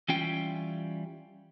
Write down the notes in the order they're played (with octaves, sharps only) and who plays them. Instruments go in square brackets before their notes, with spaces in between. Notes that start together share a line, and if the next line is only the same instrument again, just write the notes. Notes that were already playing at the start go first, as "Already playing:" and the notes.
[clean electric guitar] E3 G3 C#4 F4 G5